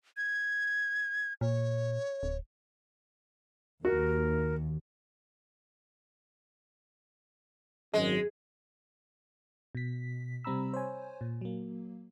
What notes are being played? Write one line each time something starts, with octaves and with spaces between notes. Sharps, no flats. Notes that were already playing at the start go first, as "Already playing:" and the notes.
G#6
A#2 C#5
D1
D#2 F#4 A#4
G#1 F#2 G#3
B2 B6
C3 G3 C4 A#5 B5 E6
C5 C#5 G#5
A#2
F#3 A#3